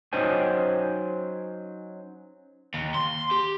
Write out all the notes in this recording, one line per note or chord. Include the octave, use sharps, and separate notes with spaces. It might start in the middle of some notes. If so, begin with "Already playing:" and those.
F#3 C#4 D#4 C5 G5 G#5
D#2
C6
G4